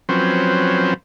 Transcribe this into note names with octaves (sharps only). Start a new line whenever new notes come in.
F3 F#3 C4 C#4 B4 C5